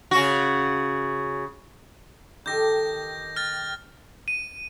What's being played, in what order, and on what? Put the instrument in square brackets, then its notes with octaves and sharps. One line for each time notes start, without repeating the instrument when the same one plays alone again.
[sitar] C#3 F#4
[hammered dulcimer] D#3 G4 A4 [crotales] G6 A#6
[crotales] F6 A6
D#7